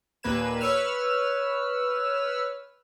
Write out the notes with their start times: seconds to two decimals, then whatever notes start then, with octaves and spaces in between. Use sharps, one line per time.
0.23 D#2 A#2 A#3 B4 G#6 E7
0.61 B4 C#5 E6 F6